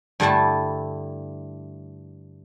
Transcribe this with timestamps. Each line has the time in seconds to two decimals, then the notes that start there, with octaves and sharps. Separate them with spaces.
0.20 G2 D3 G3 A3 E4 A5